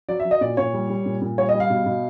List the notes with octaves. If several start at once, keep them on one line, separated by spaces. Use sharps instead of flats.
F#3 D5
E5
F#3
D#5
A#2 D5
A#2 C#5
G3
G3
A#2
A#2
G3 C#5
D#5
G3
F5
B2
B2